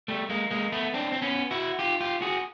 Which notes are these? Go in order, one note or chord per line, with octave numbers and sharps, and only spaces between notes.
G3 A3
G#3 A#3
G#3 A#3
A3 B3
C4 D4
C4
B3 C#4
E4 F#4
F4 G4
F4 G4
F#4 G#4